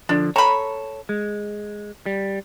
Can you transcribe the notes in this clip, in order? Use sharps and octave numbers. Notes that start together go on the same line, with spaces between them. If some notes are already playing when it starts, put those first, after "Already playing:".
D3 F3 D4
A4 C#5 A#5 B5
G#3
G3